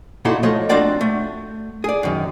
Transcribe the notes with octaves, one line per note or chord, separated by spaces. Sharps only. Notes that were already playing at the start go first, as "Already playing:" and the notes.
A#2 D#4 E4 F#4 A4 C6
F3 A3 C#5 D#5 C6
C4 D4 F4 F#4 D5 G5
A3
G#4 D5
F#2 D#3